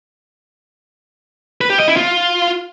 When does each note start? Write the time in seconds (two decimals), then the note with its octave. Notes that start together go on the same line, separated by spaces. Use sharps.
1.61 B4
1.70 G4
1.79 D#5
1.88 E4
1.96 F4